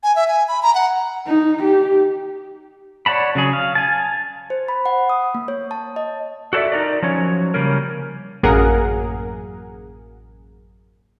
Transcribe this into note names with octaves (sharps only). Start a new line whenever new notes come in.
G#5
E5
G#5
B5
A#5
F#5
D#4
G4
C#5 D5 F#5 A5 B5
C#3 F#3 G#4
F5
G#5 A5
C5
B5
F#5
D#6
A#3
C#5
A5
D#5
F#4 A4 C5 D5 E5
D#4 A#4 D5
F3 F#3 C#4 C#5
C#3 G3 A#3 C#4 A#4
A1 F#2 A#3 G#4 A#4 F#5